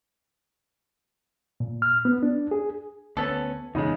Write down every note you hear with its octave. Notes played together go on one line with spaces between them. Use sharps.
A#2
F6
B3
D4
G#4
D2 B3 C#4 A4
E2 C#3 G#3 D#4